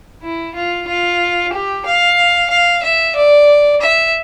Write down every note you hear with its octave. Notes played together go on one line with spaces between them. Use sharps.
E4
F4
F4
G4
F5
F5
E5
D5
E5